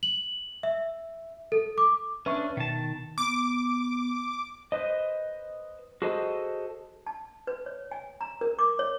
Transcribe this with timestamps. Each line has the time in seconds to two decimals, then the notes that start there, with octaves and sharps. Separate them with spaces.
0.03 F#7
0.63 E5
1.52 A4
1.78 D6
2.26 C#4 D4 B4 E5 C#6
2.57 B2 D#3 A5
3.18 B3 D6
4.72 B4 C5 D#5
6.02 F#4 G#4 A4 C5 D#5
7.07 A5
7.47 B4
7.66 C#5
7.91 G#5
8.21 A#5
8.41 A#4
8.59 D6
8.79 C#5